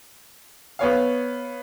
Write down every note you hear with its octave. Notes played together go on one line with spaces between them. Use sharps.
B3 C#5 F5